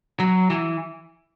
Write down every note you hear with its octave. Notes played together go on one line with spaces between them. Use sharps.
F#3
E3